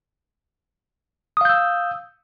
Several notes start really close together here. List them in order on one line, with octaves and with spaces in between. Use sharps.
D#6 F5 G6 E6